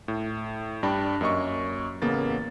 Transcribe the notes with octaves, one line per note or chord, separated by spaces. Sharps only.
A2
G2 D4 G5 B5
F#2 A#3 D#5 C#6
A1 C#3 A#3 B3 A6